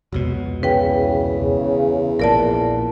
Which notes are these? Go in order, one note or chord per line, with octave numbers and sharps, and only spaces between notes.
F1 C#2 B2 F#3
E2 C#3 B4 G5
A#1 A#2 A#4 D5 A5